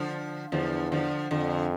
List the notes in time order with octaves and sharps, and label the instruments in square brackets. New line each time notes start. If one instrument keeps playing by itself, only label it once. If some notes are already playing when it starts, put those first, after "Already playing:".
Already playing: [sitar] D3 F3
[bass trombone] E2 [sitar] D3 F3
[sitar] D3 F3
[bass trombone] F2 [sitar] D3